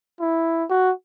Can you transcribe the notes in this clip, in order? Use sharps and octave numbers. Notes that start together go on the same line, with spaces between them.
E4
F#4